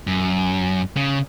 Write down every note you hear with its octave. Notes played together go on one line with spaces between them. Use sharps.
F#2
C#3